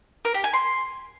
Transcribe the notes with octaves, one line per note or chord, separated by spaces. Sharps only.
A#4
G4
G#5
C6